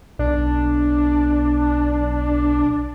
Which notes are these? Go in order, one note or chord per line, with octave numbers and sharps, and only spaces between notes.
B1 D4